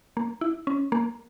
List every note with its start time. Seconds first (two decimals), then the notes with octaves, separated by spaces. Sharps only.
0.17 A#3
0.41 E4
0.67 C#4
0.92 A#3